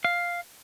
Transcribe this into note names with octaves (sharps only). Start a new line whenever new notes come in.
F5